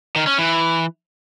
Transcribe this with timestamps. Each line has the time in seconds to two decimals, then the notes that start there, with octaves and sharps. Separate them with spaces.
0.16 D#3
0.27 C#4
0.38 E3